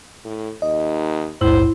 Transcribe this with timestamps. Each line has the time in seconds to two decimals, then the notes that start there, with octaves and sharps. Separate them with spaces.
0.25 A2
0.62 D#2 D#5
1.41 A#1 D#2 G#2 E4 C5